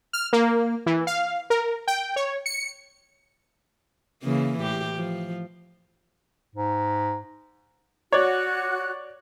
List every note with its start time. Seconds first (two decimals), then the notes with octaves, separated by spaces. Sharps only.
0.13 F6
0.33 A#3
0.86 E3
1.07 F5
1.50 A#4
1.88 G5
2.16 C#5
2.46 C#7
4.23 C#3 E3 A#3
4.60 A2 G4
4.96 F3
6.55 G#2
8.12 F#4 C#5 D5 F#6